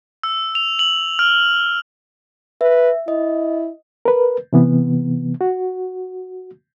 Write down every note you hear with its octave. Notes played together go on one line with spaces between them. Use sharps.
E6
F7
F#7
F6
B4 E5
E4 D#5
A#4 B4
C3 E3 B3
F#4